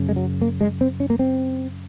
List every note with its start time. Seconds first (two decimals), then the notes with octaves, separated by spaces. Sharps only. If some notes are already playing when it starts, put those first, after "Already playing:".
Already playing: F#2 C#3
0.09 G#3
0.16 F#3
0.41 A#3
0.61 G#3
0.81 C4
1.00 C#4
1.10 A#3
1.19 C4